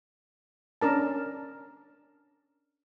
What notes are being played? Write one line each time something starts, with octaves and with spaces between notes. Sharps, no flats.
C#4 D4 A#4 A5